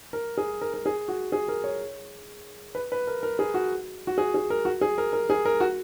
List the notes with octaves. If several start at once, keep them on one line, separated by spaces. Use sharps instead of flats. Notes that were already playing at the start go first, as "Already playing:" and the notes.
A#4
G#4
A#4
A#4
G#4
F#4
G#4
A#4
C#5
B4
B4
A#4
A#4
G#4
F#4
F#4
G#4
G#4
A#4
F#4
G#4
A#4
A#4
G#4
A#4
F#4